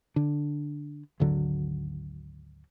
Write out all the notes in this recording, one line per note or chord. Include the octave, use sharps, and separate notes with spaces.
D3
G#1 D2 D3 F#3